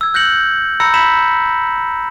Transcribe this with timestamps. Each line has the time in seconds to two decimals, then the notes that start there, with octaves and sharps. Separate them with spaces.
0.01 E6 G#6
0.14 F#6 G6 A#6 C#7 F#7
0.80 A#5 B5 E6 G6 A#6 C#7
0.94 B5 G#6 B6 E7 F#7